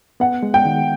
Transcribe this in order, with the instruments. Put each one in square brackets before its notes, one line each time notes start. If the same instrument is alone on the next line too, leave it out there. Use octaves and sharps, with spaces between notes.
[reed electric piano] B3 [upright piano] F#5
[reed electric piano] G#3
[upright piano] G5
[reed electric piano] D#3